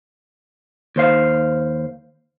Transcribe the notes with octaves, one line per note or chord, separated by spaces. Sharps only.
D#2 C5 F5